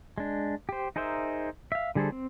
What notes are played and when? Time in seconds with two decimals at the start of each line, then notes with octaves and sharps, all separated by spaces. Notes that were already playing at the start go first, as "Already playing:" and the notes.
0.18 G#3 D4
0.69 G4 C5
0.96 D#4 G#4 A#4 C5 E5
1.72 E5 F5
1.95 D3 G3 G#4 A4 C5
2.12 C4